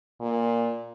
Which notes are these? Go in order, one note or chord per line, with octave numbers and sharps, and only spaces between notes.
A#2